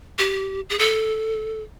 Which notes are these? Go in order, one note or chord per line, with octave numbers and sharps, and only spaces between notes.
G4
G#4
A4